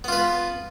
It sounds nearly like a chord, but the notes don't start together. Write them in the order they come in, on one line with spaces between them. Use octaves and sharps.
B3 F4 B4